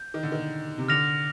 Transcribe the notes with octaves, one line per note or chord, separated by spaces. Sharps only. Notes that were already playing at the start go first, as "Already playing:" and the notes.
Already playing: G6
D#3
D3
D#3
C3
D3 F6 A#6 F7